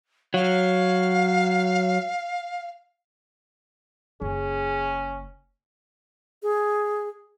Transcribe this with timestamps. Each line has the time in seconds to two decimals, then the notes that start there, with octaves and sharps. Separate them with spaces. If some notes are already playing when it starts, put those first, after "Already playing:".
0.34 F#3 F5
4.22 F#1 C#4 G#4
6.43 G#4